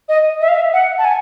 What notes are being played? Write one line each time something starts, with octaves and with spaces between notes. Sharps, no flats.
D#5
E5
F5
E5
F#5
A5
G#5